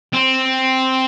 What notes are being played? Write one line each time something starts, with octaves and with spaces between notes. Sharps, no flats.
C4